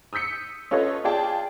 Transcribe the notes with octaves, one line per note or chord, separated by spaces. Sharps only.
D#6 E6 G6 B6 C#7
C#4 F4 A4 B4 C#5 D#5
F4 G#4 D5 G5 A5